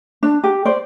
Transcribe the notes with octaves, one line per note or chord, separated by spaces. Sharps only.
D4
G4
C5 D5